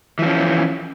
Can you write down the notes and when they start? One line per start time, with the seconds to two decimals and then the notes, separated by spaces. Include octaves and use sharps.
0.19 E3
0.22 F3
0.26 C#4